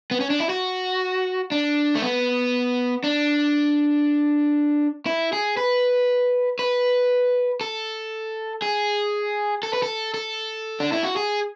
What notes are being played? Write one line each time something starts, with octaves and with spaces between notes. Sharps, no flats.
B3
C#4
D4
E4
F#4
D4
A3
B3
D4
E4
G#4
B4
B4
A4
G#4
A4
B4
A4
A4
D4
E4
F#4
G#4